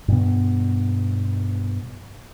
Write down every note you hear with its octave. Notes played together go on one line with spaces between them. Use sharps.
G2 B2 B3